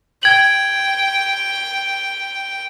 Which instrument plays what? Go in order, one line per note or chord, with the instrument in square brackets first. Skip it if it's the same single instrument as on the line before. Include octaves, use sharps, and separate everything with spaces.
[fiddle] G5 [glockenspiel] G#6 F#7